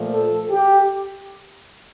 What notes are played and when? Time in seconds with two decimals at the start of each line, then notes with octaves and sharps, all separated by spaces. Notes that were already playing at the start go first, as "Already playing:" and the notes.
Already playing: A#2 F3 A3
0.12 A4
0.51 G4